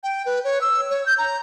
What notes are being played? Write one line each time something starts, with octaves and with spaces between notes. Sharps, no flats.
G5
B4
C#5
E6
C#5
G6
A#5